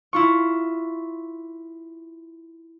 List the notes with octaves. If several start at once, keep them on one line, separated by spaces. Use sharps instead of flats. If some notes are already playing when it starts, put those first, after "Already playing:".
E4 F4 C#6